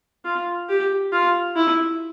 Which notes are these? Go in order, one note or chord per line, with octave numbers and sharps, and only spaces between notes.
F4
G4
F4
E4